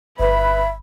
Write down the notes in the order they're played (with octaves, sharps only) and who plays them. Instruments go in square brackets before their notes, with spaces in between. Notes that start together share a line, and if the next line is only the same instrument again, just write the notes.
[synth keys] G1 [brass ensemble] B4 [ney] E5 [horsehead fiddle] B5